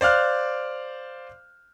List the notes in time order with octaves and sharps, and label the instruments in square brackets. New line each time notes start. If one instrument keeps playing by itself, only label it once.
[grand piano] C5 D5 F5 F6 F#6